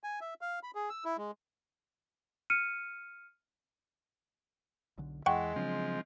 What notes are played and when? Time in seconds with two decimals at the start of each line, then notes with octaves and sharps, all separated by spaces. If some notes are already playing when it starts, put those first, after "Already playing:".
0.04 G#5
0.21 E5
0.41 F5
0.63 B5
0.75 G#4
0.90 E6
1.05 E4
1.18 G#3
2.50 F6 C#7 D#7
4.98 B1 D3
5.26 E2 E3 G#3 F#5 G5 C#6
5.56 C#3 F3 F#3 C4 D4